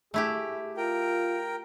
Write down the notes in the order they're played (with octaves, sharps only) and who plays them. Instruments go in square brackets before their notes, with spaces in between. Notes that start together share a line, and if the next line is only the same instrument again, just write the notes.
[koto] A3 E4 G4 [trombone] G#4
[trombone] F4 [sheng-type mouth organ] A#4 G5